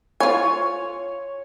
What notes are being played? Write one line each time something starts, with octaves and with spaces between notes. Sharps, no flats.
F4 C#5 G#5